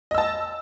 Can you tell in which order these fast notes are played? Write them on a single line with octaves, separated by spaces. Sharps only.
D#5 E6 A5